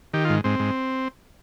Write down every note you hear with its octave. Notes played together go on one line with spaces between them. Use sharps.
D#3 G4
G#2 F4
G#2 C4
G#2